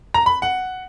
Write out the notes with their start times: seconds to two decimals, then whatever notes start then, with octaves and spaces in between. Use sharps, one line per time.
0.14 A#5
0.26 B5
0.42 F#5